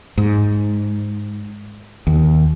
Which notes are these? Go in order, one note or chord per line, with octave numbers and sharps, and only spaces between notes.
G#2
D#2